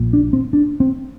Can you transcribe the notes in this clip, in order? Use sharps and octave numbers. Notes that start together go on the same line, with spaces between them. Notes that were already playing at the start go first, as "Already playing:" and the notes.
Already playing: A#1 A#2
D4
C4
D4
C4